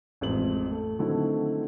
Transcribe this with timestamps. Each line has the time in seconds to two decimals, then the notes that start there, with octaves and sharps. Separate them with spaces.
0.21 A1 F2 G#3 F#7
0.71 A3
0.99 D3 D#3 F#3 A3 C4 E4